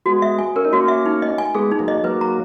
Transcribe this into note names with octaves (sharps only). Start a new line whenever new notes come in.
G#3 B3 F#4
E5
G#5
C#4 A#4
D#4
A#3 C#4 F#4
E5
D#4
D#5
G#5
G#3 B3 G#4
D#4
F#3 A#3
D#5
F#3 A#3 B4
A#5